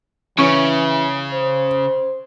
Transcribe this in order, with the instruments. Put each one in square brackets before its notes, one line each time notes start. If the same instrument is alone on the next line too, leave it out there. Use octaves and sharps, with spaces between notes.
[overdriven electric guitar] C#3 [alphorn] E3 [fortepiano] C#4
[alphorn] C5